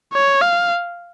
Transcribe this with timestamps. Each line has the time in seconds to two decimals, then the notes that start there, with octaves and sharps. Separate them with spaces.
0.13 C#5
0.41 F5